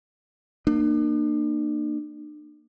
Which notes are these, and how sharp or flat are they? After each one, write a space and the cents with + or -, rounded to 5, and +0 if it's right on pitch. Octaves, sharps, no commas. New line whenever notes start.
A#3 -5 D4 +40